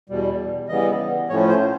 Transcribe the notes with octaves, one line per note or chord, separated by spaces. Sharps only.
E2 B2 G3
C#3 E3 G3 B3 D#5
A2 F3 A3 C#4 C#5
C5